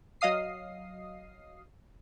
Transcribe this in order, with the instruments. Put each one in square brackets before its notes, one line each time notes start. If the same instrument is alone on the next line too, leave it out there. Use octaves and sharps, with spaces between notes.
[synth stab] F#3 D#5 F5 D#6 C7